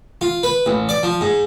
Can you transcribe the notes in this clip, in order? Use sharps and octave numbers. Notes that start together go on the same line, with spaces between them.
F4
B4
A1
D5
F3
G#2